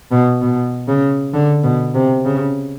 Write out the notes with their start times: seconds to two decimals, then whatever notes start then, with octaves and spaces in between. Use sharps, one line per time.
0.11 B2
0.42 B2
0.88 C#3
1.34 D3
1.63 B2
1.95 C3
2.25 C#3